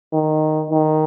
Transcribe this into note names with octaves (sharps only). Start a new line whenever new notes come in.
D#3
D#3